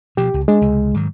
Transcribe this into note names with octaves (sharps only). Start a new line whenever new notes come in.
B2 F3 G4
C#2
G#3 D4
C#2 C3
G#2 D#3 F#3